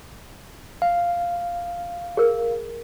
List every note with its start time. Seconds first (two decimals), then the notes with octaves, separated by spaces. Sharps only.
0.82 F5
2.17 G#4 A#4